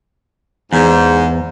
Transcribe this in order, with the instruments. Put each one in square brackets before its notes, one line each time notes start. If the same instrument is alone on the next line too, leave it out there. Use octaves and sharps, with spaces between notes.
[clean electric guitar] E2 [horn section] G#2